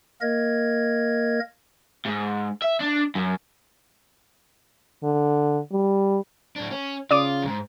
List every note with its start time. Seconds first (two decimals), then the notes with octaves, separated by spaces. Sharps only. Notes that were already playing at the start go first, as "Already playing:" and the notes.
0.21 A#3 A#4 D#5 G#6
2.06 G#2
2.62 E5
2.80 D4
3.15 F#2
5.03 D3
5.72 G3
6.56 A2 D4
6.71 C#4
7.11 C#3 F4 D5 D6 D#6
7.43 E2 G#2